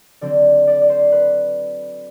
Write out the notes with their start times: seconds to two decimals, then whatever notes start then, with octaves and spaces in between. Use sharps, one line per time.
0.21 D3 F#3 C4 D5
0.67 D5
0.82 D5
0.89 C5
1.12 B4